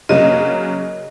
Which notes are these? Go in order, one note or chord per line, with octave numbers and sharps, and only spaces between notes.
C#3 F#3 A#3 D#5